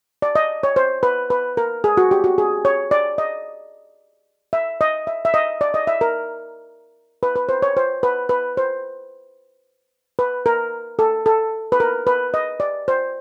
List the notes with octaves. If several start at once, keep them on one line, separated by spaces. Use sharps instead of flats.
D5
D#5
C#5
C5
B4
B4
A#4
G#4
F#4
G4
F#4
G#4
C#5
D5
D#5
E5
D#5
E5
E5
D#5
D5
D#5
E5
A#4
B4
B4
C5
C#5
C5
B4
B4
C5
B4
A#4
A4
A4
B4
A#4
B4
D#5
D5
C5